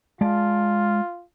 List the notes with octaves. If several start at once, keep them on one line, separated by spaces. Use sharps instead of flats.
G#3 F4 D5 A5